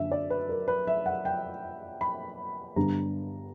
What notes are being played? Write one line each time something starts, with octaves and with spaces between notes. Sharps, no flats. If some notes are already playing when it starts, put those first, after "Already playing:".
Already playing: F#2 D3 A#3 D4 E5
D5
B4
A#4
B4
E5
F#5
G5
B5
G2 D3 G3 B3 D4 A#5